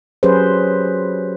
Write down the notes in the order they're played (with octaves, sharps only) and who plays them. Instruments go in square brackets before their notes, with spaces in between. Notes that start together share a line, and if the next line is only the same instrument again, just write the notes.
[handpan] F#3 C#4 G4 G#4 B4 C5